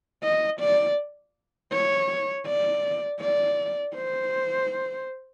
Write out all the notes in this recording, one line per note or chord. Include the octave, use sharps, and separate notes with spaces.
D#5
D5
C#5
D5
D5
C5